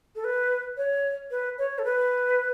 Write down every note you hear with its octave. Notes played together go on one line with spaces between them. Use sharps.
A4
B4
C#5
B4
C#5
A4
B4